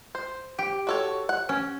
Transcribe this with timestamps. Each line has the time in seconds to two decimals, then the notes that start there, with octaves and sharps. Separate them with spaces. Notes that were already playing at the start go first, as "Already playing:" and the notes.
0.15 C5
0.59 G4
0.87 F#4 A4 C#5
1.29 F#5
1.49 C#4